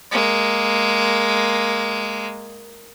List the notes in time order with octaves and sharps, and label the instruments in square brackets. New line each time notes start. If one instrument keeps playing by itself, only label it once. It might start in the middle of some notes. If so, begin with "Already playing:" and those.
[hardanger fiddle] G#3 A#3